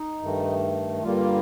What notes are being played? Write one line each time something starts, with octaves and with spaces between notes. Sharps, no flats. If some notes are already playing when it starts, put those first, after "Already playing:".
Already playing: D#4
G2 D#3 A3
G2 D3 G3 A#3 F4